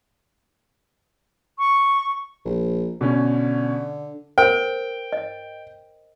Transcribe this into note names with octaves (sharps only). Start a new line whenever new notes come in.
C#6
A#1
B2 D3 C#4
A#4 C5 G5
D#5